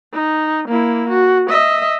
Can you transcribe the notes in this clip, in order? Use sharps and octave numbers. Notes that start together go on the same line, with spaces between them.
D#4
A#3 E4
F#4
D#5 E5